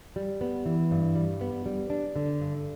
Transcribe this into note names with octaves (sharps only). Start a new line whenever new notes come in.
G3
B3
E3
G2
G3
B3
G3
D4
D3
G2